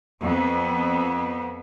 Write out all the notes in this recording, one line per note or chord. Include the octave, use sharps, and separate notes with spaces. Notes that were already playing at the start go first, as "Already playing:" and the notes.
F2 B3